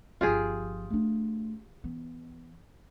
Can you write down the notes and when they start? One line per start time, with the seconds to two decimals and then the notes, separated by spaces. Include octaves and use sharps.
0.21 G1 F3 F4 G4 G#4
0.90 A3 D4
1.84 E3 B3